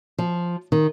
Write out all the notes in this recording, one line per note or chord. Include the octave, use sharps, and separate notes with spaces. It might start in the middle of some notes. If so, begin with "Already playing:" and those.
F3
D#3